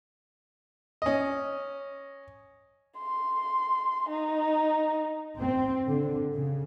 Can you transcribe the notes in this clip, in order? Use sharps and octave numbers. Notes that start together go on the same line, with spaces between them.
C#4 D#5
C6
D#4
C4
D3
C#3